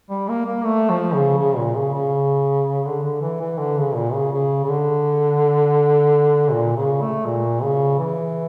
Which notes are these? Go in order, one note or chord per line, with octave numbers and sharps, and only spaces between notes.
G3
A#3
A#3
A3
F3
C#3
C#3
A#2
C#3
C#3
D3
D3
E3
E3
D3
C#3
A#2
C#3
C#3
C#3
D3
A#2
C#3
A3
A#2
C#3
E3